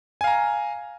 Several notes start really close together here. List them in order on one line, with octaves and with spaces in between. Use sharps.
G#5 F5 A#5